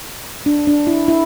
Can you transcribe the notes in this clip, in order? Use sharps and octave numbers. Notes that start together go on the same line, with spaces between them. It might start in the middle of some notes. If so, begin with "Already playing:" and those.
D4
D4
E4
E4